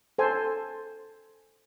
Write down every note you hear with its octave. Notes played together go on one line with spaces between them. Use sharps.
A4 C5 G#5